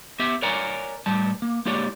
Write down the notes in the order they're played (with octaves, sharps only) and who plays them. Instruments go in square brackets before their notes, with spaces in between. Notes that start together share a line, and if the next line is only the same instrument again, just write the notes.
[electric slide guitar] B3 G4 E5
A#4 C#5 D5 F#5 G#5 A#5
A2 G3 A5
A#3
G#3 A#3 E4 G4 C#5 D5